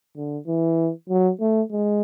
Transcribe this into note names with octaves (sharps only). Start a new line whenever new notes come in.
D3
E3
F#3
A3
G#3